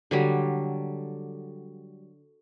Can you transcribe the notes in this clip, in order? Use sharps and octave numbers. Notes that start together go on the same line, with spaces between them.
D3 F#3 G3